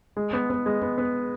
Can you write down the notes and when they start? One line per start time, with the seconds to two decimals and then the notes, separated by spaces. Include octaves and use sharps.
0.17 G#3
0.33 B3
0.50 B3
0.66 G#3
0.82 B3
0.98 B3